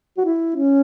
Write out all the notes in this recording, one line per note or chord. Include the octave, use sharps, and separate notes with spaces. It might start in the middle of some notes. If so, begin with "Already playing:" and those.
F#4
E4
C#4